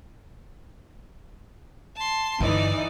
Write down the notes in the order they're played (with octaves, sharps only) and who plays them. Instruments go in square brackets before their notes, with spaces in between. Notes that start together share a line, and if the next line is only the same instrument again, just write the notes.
[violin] A5 C6
[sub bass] G2 [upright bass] D3 [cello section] E3 D#4 [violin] D5